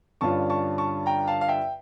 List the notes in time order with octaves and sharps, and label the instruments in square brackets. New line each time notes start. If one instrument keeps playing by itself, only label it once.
[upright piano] G2 D3 G3 C#4 F4 [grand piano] A5 C#6
[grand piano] A5 C#6
A5 C#6
G5 A#5
F5 A5
F5
E5 G5